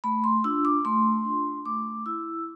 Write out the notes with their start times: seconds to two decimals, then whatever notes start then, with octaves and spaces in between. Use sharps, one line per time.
0.04 A3 B5
0.24 C6
0.44 D4 F4 E6
0.65 D6
0.85 A3 C6
1.25 D4 F4
1.66 A3 D6
2.06 E4 E6